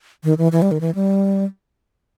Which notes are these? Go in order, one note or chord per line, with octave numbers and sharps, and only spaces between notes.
D#3
E3
E3
G3
D#3
E3
G3